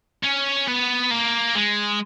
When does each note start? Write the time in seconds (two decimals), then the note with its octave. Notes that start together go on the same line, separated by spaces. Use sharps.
0.24 C#4
0.68 B3
1.11 A#3
1.55 G#3